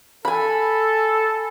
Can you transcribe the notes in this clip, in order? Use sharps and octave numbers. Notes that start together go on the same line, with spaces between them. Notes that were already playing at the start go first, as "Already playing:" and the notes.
A4 G#5 B5